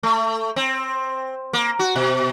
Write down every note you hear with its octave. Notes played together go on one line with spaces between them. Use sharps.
A3
C4
A#3
F#4
B2